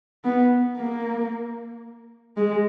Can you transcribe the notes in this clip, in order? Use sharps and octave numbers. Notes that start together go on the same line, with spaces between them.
B3
A#3
G#3